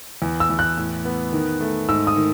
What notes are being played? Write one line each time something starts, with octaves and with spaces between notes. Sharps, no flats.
E2
E6
E2
F#6
A2
B3
D#3
A3
G#2 E6
D#6
D#3